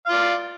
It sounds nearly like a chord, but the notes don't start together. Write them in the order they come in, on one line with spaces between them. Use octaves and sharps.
F5 F4 D5